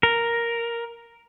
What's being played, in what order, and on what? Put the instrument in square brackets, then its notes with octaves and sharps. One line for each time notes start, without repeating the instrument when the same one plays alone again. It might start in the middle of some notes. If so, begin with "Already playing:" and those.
[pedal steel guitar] A#4